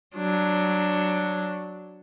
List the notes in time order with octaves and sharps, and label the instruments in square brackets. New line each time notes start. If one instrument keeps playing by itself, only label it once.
[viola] F#3 D4